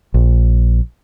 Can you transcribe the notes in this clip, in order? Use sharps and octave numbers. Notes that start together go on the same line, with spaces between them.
A#1